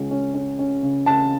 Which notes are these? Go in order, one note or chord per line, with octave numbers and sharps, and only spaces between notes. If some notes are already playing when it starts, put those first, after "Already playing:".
Already playing: C#2 C#4
C#4
C#4
C#4
C#3
C#3 A5